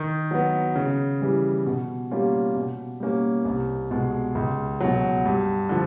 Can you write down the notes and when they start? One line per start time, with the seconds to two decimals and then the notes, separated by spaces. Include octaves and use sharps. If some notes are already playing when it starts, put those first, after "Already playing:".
Already playing: D#3
0.31 F#3 B3
0.76 C#3
1.21 E3 G3
1.66 B2
2.11 G3 A#3 C#4 F4
2.56 B2
3.00 G3 A#3 C#4
3.45 C2
3.91 B2 G#3
4.35 C#2
4.81 B2 F#3
5.26 G2
5.69 D3 F3